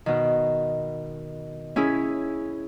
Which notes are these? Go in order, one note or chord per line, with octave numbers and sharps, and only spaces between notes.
B2 D#3
C#4 E4 G#4